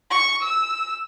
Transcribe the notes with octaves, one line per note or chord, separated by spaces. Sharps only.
C#6
E6